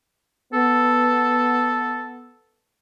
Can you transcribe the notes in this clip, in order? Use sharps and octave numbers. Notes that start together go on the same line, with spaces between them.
B3 A4